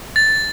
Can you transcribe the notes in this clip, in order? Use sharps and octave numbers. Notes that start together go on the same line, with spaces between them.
A6